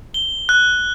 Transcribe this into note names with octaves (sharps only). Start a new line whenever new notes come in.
G7
F#6